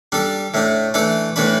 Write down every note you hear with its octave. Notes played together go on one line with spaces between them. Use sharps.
G3 D4 A4
A2 A3 D4
E3 A3 D4 A4
A2 E3 A3 D4 B4